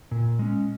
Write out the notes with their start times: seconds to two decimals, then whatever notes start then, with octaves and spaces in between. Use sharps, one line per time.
0.11 A#2
0.39 G#3 C#4